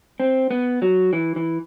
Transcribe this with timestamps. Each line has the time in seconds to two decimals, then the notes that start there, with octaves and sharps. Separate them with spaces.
0.20 C4
0.51 B3
0.82 F#3
1.13 E3
1.36 E3